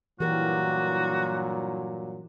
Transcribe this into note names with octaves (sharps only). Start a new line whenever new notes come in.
G2 A#2 E3 F#3 F#4 G4 A#4